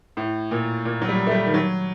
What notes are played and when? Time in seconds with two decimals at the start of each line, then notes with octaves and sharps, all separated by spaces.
0.17 A2
0.51 A#2
0.85 A#2
1.02 F#3
1.09 G3
1.27 A3
1.31 G3
1.46 D#3
1.54 F#3